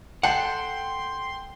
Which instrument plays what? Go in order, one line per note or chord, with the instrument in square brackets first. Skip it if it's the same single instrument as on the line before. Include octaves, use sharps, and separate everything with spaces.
[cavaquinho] A4 [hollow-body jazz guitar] F#5 [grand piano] G5 [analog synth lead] C6